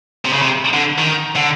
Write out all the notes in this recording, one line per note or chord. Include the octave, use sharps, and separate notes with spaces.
C3
C#3
C3
D3
D#3
D3